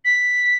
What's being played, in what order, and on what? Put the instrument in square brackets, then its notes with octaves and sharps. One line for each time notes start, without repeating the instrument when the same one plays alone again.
[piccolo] B6